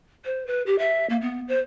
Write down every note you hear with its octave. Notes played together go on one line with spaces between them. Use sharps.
C5
B4
G4
E5
A#3
B3
C5